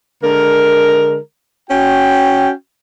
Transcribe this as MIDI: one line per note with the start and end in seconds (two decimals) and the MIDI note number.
0.23 1.17 50
0.23 1.17 56
0.23 1.17 70
1.70 2.50 61
1.70 2.50 66
1.70 2.50 79